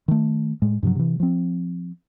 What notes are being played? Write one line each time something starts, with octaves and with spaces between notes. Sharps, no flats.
D#3 A3
A2 G#3
G2 C3 F3 F#3
C3 E3
F3 C4